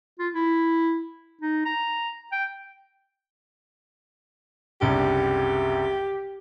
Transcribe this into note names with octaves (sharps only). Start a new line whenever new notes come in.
F4
E4
D#4
A#5
G5
F#1 C2 D4 G4